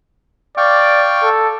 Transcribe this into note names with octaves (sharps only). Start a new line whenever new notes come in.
D5 F5 G5 C#6
A4